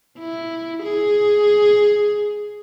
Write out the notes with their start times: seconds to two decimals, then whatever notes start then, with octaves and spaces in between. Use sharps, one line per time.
0.19 E4
0.83 G#4